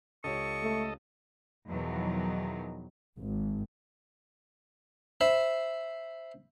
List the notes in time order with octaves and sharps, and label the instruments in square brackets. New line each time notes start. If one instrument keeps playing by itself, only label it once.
[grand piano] C#2 G4 C#5 [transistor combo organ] A4 D#5 [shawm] C#6
[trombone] A3
[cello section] E2 B2 D#3 F3 F#3
[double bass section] G#1
[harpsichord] C5 E5 B5